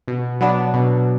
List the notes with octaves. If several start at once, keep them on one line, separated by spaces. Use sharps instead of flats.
B2
F#3 B3 D4
B2